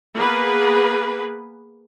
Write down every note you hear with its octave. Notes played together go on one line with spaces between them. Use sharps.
A#3 B3 G#4 B4